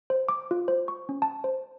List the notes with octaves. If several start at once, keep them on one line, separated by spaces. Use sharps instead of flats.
C5
D6
F4
C5
C#6
C#4
A5
C5